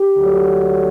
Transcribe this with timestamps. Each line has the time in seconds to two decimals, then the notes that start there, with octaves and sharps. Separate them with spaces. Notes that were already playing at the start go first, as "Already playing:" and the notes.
Already playing: G4
0.17 D2 D3 F#3